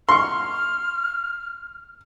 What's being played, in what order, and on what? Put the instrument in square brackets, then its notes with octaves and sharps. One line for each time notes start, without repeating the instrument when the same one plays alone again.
[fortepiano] C6 C#6 [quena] F6